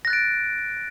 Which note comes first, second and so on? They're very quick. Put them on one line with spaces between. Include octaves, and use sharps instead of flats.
A#6 F#6 A6 D7